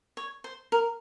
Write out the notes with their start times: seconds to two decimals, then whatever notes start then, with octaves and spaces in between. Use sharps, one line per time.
0.17 C#5
0.44 C5
0.72 A#4